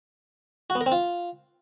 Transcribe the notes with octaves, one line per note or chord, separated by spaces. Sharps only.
F#4
B3
A#4
C4
F4